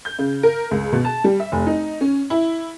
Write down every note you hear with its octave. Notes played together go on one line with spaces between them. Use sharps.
G6
C#3
A#4
C#2
B2
A5
G3
E5
F1
D#4
C#4
E4